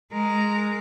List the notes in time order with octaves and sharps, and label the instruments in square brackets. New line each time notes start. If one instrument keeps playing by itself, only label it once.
[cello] G#3 A#4